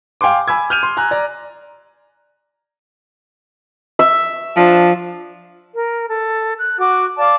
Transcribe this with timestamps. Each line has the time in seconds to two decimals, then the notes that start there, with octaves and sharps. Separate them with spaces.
0.21 F5 G5 G#5 C6 D6
0.48 G#5 B5 E6 G#6
0.70 F6 G6 D#7 F7
0.83 C6
0.97 G#5 A#5 F#6
1.11 D5 A#5
3.99 E5
4.57 F3 D4
5.73 A#4
6.08 A4
6.58 F#6
6.77 F#4 F#5 D6
7.18 D5 F5 A5 D6